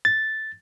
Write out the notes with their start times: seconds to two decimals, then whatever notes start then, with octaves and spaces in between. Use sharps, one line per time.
0.05 A6